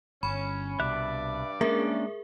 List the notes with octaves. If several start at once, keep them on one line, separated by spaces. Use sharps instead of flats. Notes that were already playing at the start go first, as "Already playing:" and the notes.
G1 C#4 B5
C2 G2 B2 D5 E5 F#6
G#3 A#3 C#4 D4 G#4 A#4 E5